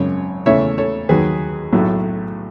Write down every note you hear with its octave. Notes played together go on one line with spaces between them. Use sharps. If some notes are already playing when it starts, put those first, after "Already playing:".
Already playing: G#1 F#2 C#3 C#5
E2 C#3 E3 A3 C#5 E5
A4 C#5
D#2 D#3 F#3 G#4 B4
B1 A2 F#3 A3